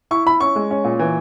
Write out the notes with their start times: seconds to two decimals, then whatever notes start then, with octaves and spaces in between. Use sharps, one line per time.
0.11 E4 C#6
0.26 E4 B5
0.41 C#4 C#6
0.56 G#3
0.71 C#4
0.84 A#2
0.99 E3